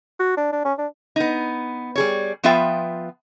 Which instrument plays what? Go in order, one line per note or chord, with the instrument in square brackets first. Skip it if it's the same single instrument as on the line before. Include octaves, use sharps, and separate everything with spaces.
[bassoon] F#4
D4
D4
C#4
D4
[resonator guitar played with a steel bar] B3 D#4
G3 G#4 C#5
F3 B3 F4 B4 E5 G5